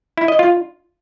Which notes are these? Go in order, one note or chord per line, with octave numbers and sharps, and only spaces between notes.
E4
D#5
F4